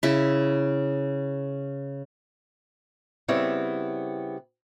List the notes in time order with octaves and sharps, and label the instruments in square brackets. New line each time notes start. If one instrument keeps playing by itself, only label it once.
[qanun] C#3 E4
[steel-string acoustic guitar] C#3 G3 B3 C4 E4 C#5